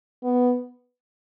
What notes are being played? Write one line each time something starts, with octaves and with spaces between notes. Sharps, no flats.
B3